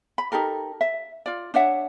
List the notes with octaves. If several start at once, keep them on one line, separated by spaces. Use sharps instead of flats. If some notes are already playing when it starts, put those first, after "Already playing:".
B5
D#4 G4 A4 A#4
E5
F4 D5
D4 C#5 E5 F#5